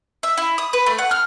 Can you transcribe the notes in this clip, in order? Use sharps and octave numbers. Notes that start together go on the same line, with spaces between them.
E5
E4
D#6
B4
A3
F#5
F6